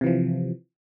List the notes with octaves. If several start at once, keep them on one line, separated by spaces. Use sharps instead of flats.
C3 E3 F3